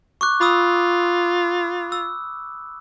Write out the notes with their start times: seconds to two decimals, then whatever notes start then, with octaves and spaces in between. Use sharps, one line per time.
0.21 C#6 D6 F#6
0.41 F4 B5 D#6 E6
1.92 E6